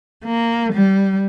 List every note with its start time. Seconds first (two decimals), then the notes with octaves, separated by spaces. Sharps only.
0.24 A#3
0.73 G3